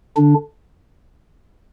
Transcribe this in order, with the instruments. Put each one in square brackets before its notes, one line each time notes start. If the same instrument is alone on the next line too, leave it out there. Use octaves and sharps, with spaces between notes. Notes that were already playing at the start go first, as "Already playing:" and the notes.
[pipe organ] D3 D4